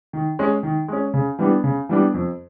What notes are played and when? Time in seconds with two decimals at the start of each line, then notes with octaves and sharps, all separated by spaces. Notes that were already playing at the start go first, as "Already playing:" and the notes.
0.13 D#3
0.39 G#3 C#4
0.63 D#3
0.88 G#3 C#4
1.14 C#3
1.39 E3 G3 B3 D4
1.64 C#3
1.89 E3 G3 B3 D4
2.14 F2